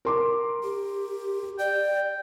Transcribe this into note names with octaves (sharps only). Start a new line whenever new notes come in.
A#4 C6 D6
G4
D5 G5